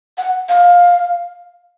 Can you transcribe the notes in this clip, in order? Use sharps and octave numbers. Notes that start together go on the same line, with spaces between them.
F#5
F5